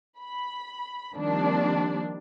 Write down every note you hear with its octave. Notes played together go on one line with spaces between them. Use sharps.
B5
D#3 F3 G3 A#3 C4 D4